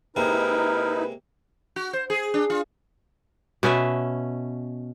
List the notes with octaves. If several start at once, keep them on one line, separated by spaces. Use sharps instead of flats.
C3 G#3 A#3 D#4 E4 A#4 B4
F#4
C5
G#4
D4
F4
B2 C#4 B4 E5